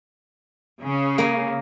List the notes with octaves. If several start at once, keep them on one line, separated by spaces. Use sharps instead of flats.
C#3
A#3 G#5